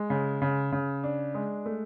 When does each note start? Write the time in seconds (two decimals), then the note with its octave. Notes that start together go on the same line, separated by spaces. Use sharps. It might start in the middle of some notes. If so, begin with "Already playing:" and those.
Already playing: G#3
0.10 C#3
0.42 C#3
0.72 C#3
1.04 D4
1.34 G#3
1.66 A3